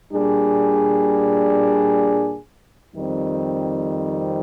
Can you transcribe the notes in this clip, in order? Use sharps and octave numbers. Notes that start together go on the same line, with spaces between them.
A#2 G3 D4 G#4
F2 D#3 G3 C4 D#4